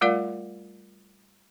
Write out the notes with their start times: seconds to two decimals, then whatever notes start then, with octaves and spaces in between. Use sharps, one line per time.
0.01 G3 A3 F4 A#4 D5 F5